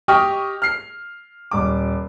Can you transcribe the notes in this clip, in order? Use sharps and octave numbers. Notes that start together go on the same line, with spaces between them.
G4 D#5 G5 C#6 D#6 F6
F6 C7
D#1 D6